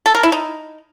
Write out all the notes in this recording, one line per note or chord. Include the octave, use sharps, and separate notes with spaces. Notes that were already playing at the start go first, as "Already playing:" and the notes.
A4
A#4
E4
D#4